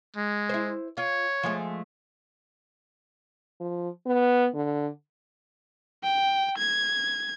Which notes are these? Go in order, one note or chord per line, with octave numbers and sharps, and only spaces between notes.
G#3
E4 C5
F4 C#5
F3 G#3 A3
F3
B3
D3
G5
G#6